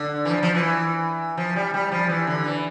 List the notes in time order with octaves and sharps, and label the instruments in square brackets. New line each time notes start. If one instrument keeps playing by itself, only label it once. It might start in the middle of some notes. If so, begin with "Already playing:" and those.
Already playing: [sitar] D3
E3
F3
F3
E3
F3
G3
G3
F3
E3
D3
E3